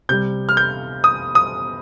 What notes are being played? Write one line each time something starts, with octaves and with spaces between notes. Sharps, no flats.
C3 G3 G6
F6
G6
D#6
D#6